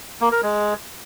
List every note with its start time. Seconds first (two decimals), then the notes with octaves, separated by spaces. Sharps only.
0.21 A#3
0.32 A#4
0.43 G#3